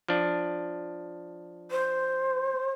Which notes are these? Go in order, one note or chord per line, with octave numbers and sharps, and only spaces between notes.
F3 D4
C5